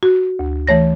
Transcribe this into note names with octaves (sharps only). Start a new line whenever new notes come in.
F#4
D2
E3 A3 C#5 A#6